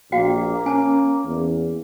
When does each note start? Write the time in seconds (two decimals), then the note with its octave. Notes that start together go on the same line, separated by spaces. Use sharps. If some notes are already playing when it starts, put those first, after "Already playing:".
0.12 A#1 A#3 F#4 F5 G5
0.66 C#4 G#5 A5
1.26 E2